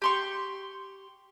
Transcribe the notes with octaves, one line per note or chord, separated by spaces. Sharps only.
G4 C6 C#6